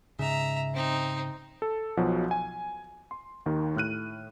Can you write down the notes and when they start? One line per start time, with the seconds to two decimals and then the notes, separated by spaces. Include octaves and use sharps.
0.19 G#2 C#3 E5 A#5
0.74 C4 D#4
1.62 A4
1.97 B1 B2 F3 F#3 F#5
2.31 G#5
3.11 C6
3.46 D#2 D#3
3.76 A2 F6 F#6 D#7